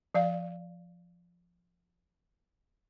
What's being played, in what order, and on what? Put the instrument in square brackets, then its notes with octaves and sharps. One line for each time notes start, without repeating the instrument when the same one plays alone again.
[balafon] F3 D5 F5